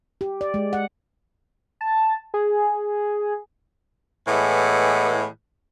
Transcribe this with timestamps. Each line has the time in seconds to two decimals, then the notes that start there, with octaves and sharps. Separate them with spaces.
0.21 G4
0.41 D5
0.54 G#3
0.73 F#5
1.81 A5
2.34 G#4
4.28 A2 E3 G#3 B3